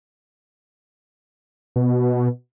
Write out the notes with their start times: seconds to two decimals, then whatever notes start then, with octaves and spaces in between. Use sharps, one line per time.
1.76 B2